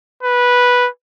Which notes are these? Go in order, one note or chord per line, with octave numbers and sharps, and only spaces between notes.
B4